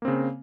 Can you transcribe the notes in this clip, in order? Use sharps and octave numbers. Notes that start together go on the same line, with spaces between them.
C#3 A#3 C4